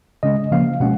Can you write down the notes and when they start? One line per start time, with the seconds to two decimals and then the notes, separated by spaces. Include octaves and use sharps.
0.23 C#3 G#3 C#4 D#5
0.51 C#3 F3 A#3 C#4 F5
0.80 B2 G#3 C#4 F#5